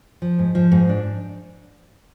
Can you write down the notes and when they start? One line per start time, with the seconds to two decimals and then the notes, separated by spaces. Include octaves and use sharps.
0.22 F3
0.39 G#2
0.55 F3
0.72 G#2
0.89 D4